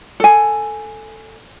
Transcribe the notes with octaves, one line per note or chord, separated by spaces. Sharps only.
A4 G#5